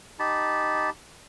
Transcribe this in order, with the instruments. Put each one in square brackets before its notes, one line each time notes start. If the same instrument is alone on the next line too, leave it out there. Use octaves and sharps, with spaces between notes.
[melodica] D#4 G4 A5 B5